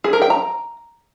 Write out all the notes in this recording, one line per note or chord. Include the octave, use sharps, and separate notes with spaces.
G#4
A#4
G5
A#5